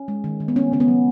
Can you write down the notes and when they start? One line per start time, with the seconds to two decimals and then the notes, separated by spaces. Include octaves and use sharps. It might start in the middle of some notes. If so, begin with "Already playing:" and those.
Already playing: C#4
0.08 G#3
0.24 D#3
0.40 D#3
0.48 B3
0.56 A3 C#4
0.72 C#3 C#4
0.80 B3
0.88 F#3